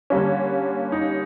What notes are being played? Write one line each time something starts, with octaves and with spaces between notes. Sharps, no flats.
D3 G3 A#3 C#4
D#4